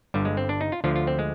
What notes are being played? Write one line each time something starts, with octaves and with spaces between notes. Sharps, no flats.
G1 G2 D3 G3
G#3
C4
D4
D#4
F4
D2 D3 F3 F4
F4
C4
G#3